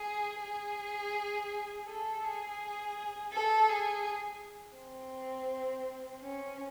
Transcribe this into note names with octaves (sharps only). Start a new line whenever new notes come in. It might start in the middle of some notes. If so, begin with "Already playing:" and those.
Already playing: G#4
G#4
A4
G#4
A4
G#4
C4
C#4